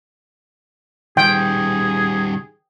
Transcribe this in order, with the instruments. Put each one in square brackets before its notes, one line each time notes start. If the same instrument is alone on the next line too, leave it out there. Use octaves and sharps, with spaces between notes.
[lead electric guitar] D#3 G3 [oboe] G#4 [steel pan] G5